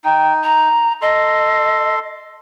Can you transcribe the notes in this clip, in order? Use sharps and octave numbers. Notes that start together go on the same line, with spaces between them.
D#4 G5
A#5
A4 D#5 C6